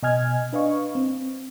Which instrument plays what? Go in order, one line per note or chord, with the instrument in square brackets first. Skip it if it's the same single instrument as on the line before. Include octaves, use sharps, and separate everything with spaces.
[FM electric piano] B2 D#5 G#5 F6 G#6
D4 B4 D#5 F5 C#6
C4